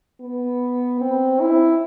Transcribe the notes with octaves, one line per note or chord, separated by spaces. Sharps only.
B3
C4
E4